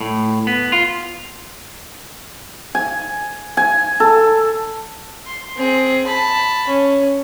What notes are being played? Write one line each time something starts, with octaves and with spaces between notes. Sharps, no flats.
A2
B3
F4
G#5
G#5
A4
C6
C4 G#4
A5 B5
C#4